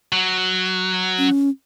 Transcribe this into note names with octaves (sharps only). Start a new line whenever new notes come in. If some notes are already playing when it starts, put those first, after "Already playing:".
F#3
C#4